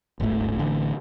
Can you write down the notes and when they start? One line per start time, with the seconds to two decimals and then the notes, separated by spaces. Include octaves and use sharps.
0.20 D1 G1 G#2 A3
0.59 A1 D3